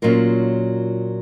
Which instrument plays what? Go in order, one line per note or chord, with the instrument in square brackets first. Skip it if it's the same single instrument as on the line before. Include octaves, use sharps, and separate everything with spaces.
[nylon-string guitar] A#2 F#3 C#4 F4 A#4